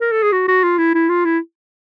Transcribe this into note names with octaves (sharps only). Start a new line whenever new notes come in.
A#4
A4
G#4
F#4
F#4
F4
E4
E4
F4
E4